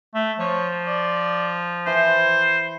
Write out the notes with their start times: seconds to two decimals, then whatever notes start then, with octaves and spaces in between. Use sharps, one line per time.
0.15 A3
0.39 F3 C#5
0.87 D5
1.87 E3 C5